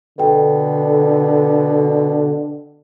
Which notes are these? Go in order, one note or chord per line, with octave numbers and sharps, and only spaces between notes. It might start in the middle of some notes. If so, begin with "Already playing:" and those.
B2 D3 A4 G5